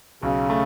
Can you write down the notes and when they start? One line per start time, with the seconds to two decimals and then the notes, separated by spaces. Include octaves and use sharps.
0.22 B1 C#3
0.50 A3